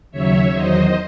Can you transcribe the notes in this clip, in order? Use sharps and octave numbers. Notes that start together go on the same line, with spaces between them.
D#2 C#3 F#3 C#5 E5
E2 D#3 F#3 C5 D#5